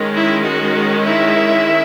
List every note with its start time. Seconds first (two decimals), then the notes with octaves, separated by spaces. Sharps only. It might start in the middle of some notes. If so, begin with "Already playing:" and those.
Already playing: D#3 G#3 C#4
0.17 E4
0.46 F#4
1.04 E4 E5